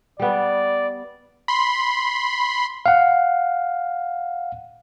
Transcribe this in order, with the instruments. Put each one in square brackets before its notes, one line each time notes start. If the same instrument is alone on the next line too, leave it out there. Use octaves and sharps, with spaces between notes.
[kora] G3 B3 [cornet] D5
[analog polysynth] B5 C6
[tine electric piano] F5 F#5